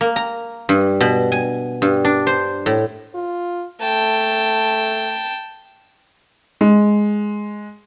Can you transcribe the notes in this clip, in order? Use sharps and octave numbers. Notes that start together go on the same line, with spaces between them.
A#3
A#5
G2
B2
G#5
G2
D4
C5
A2
F4
A3 G5 A5
G#3